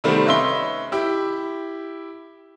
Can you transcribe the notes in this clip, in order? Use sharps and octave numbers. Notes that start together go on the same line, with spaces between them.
C3 D#3 G3 A3 B3 C4
C#4 B4 D#5 E5 C6 G7
E4 G4